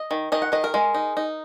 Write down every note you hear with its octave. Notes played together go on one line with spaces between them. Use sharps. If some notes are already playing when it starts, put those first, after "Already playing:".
Already playing: D#5
D#3
D#3 D#5
F#5
D#3 D#5
A#4
G#3
D#4
D#4